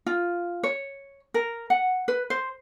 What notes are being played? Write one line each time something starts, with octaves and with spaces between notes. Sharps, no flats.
F4
C#5
A#4
F#5
B4
C5